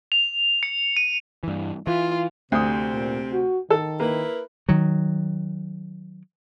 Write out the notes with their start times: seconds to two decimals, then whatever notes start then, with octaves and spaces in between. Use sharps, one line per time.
0.12 F7
0.63 C#7
0.97 D#7
1.43 G2 E3
1.87 E3 F4
2.52 D2 C3 C4 D#6
2.93 A#2
3.33 F#4
3.70 D#3 A4
4.00 A#3 E4 A#4 B4
4.69 D#3 F#3